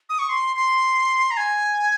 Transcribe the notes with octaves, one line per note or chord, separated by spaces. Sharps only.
D#6
C#6
C6
C6
A#5
G#5